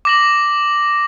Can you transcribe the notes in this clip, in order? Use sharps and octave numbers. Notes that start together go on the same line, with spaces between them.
D6 A#6 F#7